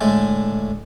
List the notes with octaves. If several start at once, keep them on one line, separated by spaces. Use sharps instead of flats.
A2 D3 G#3 A3